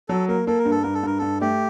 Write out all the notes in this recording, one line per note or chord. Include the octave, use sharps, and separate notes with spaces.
F#3 A4
A#3 A#4
A#3 A4
A#4
G2
A4
G2 A#4
A4
G2 A#4
G2 A4
A3 G4